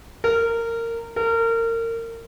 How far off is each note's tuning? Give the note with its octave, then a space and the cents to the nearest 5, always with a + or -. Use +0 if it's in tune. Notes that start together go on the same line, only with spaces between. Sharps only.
A#4 -20
A#4 -30